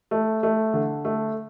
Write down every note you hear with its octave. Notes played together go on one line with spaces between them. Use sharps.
A3
A3
D3
A3